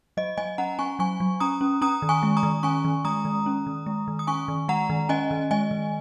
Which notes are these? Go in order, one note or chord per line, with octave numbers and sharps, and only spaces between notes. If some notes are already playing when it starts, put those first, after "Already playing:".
F#3 D#5
F#3 D#5 G#5
C#4 F#5 A#5
C#4 G#5 C#6
F#3 G#5 C#6
F#3
C#4 A#5 D#6
C#4
C#4 A#5 D#6
D#3
G#5 C#6
G#3
A#5 D#6
D#3
C#4 G#5 C#6
D#3
G#3 A#5 D#6
D#3
C#4
D#3
G#3
D#3
D#6
C#4 G#5 C#6
D#3
G#3 F#5 A#5
D#3
C#4 D#5 G#5
D#3
G#3 D#5 G#5
D#3